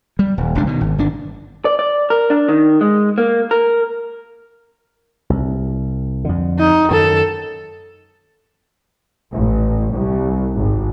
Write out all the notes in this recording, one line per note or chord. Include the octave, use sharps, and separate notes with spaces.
G3
D#1
D#1 C#2 G2 D4
B2 D#3
G#1
G1 D#3 D4
D5
D5
A#4
D4
D#3
G#3
A#3
A#4
C2
F2 D3
D#4
F#2 D#3 A4
A1
C2
G#1